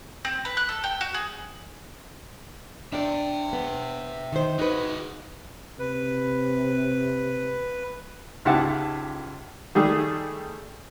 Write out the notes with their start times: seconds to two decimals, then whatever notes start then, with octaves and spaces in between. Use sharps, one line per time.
0.25 C4
0.45 B4
0.57 F#6
0.69 A4
0.84 G5
1.01 F#4
1.14 G#4
2.92 D4 D5 E5 G5
3.53 B3
4.32 D#3 C5
4.59 D#4 F#4 G#4 B4
5.79 C3 B4
8.45 C#2 G#2 E4 G4 F#5 A5
9.75 D#3 G3 A3 G#4